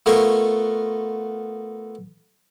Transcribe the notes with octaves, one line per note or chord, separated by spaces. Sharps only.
A3 B3 F4 A#4 C6 C#6